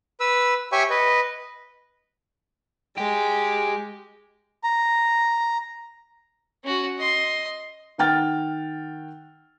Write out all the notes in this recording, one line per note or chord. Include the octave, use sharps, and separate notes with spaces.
B4 E6
G4 C#5 E5 G5 G#5 C#6
B4 D#5
G#3 G4
A#5
C#4 F#4
D#5 C6
D#3 F#5 G5 F6 A6